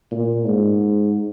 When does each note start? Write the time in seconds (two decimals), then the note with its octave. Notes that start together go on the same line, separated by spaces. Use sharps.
0.12 A#2
0.47 G#2